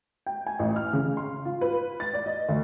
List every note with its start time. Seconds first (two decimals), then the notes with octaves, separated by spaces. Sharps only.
0.26 G5
0.47 G#5
0.59 A1
0.76 F6
0.93 C#3
1.17 C6
1.45 F4
1.61 B4
2.00 A6
2.14 D5
2.26 D#5
2.49 D2